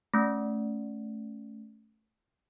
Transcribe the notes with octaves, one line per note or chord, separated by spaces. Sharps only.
A3 C#4